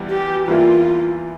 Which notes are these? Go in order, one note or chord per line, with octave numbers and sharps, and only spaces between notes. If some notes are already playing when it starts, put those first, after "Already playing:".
Already playing: E2 E3 G3
G4
E2 E3 G3 A#3 E4 F4